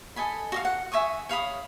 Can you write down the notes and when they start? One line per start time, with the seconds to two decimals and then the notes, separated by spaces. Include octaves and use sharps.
0.16 A4 D#5 G#5 B5
0.52 F#4 D#5 F5
0.65 F#5
0.92 E5 G#5 C#6 D#6
1.29 C#5 F5 B5 D#6